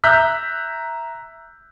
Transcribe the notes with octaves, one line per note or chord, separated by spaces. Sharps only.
E5 A#5 F#6 G6 B6